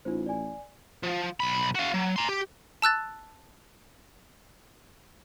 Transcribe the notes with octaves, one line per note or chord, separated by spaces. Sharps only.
A1 D#4 F4 C5
D5 G#5
F3
B1 B5
F#4 F5
F#3
A#5 C6
G4
A5 E6 F#6 A6